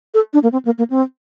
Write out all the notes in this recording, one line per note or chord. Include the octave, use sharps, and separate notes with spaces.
A4
D4
A#3
C4
A#3
A#3
C4